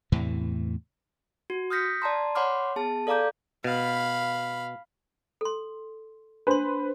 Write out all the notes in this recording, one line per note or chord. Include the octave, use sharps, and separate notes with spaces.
E2 A2 C3 E3
F#4
D#6 F6 G6 A#6 B6 C#7
D5 A5 A#5 C6
C#5 F#5 B5 C6 D6 F6
B3 G#4 A5
A4 D5 F5 A#5 D6 G6
B2 F5 B5
A4 C6
D4 B4 C5 C6